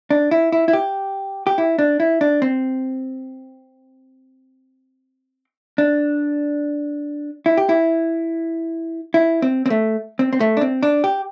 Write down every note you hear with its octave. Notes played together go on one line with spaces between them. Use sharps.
D4
E4
E4
E4
G4
G4
E4
D4
E4
D4
C4
D4
E4
G4
E4
E4
C4
C4
A3
C4
C4
A3
D4
C4
D4
G4